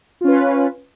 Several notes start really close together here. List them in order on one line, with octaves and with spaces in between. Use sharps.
F4 C#4 B4